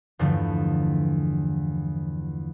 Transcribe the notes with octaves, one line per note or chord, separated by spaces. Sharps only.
E2 G2 D3 F3 A3